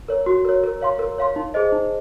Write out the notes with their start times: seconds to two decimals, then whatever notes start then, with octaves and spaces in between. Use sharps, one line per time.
0.08 A#4 C#5
0.26 F#4
0.45 A#4 C#5
0.64 A#4
0.82 C#5 F5 C6
0.99 A#4
1.18 C#5 F5 C6
1.36 D#4
1.54 G#4 C5 D#5
1.72 D#4